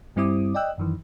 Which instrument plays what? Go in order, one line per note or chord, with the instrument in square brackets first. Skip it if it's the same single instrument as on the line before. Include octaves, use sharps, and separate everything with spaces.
[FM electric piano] G2 G3 C4 E4 D6 D#6
D5 D#5 G5 E6 F#6
F#2 D#3 E3